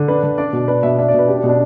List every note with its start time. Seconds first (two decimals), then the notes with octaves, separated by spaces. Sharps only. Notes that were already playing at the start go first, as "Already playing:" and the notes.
Already playing: D3
0.08 D4 B4
0.23 D3
0.38 D4 D5
0.53 B2
0.68 D4 B4
0.83 B2 E5
0.99 D4 E5
1.08 D5
1.14 B2 B4
1.28 D4 G4
1.39 D4
1.43 B2
1.49 D4